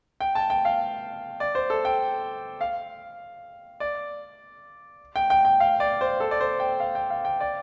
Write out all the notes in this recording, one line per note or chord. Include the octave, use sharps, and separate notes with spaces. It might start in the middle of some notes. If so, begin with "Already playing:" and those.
G5
A5
G5
F5
D5
C5
A4
G5
F5
D5
G5
G5
G5
F5
D5
C5
A4
D5
C5
G5
F5
G5
F5
G5
D5